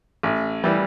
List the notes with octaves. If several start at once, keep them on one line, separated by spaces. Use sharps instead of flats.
A1
E3 G3